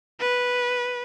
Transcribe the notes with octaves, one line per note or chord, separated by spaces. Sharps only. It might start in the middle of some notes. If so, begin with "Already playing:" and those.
B4